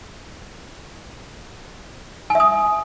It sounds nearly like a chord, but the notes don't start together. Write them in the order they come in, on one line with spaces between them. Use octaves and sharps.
G#5 E5 D#6